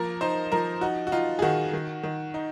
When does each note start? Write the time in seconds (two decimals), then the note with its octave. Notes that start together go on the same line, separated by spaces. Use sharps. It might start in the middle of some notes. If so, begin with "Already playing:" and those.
Already playing: F3 A#3 A#4
0.21 D#4 C5
0.52 F3 A#4
0.81 D#4 F#4
1.07 F#4
1.12 D#4 F4
1.39 G#4
1.42 D#3 F#4
1.73 D#3
2.03 D#3
2.34 D#4